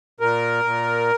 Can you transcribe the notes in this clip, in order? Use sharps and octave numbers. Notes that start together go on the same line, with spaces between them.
A#2 A#4
A#2